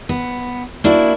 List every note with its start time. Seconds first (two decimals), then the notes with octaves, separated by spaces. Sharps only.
0.09 B3
0.84 A#3 D4 E4 F#4